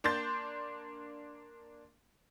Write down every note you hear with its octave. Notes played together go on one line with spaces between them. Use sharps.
A#3 D4 C6 G6 A6